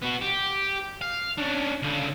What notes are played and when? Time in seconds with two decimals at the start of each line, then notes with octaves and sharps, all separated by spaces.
0.03 B3 F#4
0.22 G4
1.02 F5
1.38 C#4 D4
1.83 C#2 D3